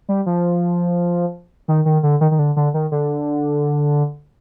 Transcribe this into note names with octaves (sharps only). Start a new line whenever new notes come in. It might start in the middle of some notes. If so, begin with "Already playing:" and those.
G3
F3
D#3
D#3
D3
D#3
D#3
D3
D3
D#3
D3